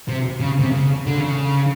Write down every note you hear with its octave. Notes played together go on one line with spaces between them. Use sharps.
C3
C#3
C3
C#3
D3
C#3